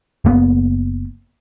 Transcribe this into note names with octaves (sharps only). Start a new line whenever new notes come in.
F#1 A#3 B3